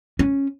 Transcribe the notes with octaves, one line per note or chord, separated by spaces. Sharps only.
C#4